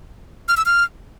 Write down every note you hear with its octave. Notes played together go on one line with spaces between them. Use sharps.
F6
E6
F6